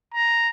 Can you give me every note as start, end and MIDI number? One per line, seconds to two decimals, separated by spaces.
0.14 0.50 82